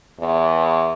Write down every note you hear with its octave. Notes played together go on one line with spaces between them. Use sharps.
E2